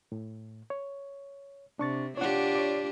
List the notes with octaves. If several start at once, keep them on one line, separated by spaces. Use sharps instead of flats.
A2
C#5
C3 D4 C#6 A6
D4 F4 G4 C#5 F#5
C#5 D5